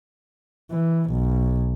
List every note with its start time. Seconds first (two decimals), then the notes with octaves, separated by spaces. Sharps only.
0.71 E3
1.10 B1